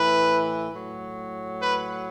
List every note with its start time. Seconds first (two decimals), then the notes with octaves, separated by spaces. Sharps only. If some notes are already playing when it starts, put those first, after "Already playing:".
Already playing: A2 E3 B4
0.71 A2 F#3
1.58 B4